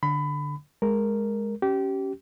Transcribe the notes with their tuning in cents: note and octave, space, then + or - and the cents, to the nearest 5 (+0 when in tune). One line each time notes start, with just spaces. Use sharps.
D3 +0 B5 +20
G#3 +0 A#4 +0
C#4 +0 G4 -25